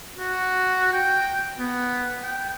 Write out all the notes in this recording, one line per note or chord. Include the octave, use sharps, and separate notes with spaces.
F#4
G5
B3
G5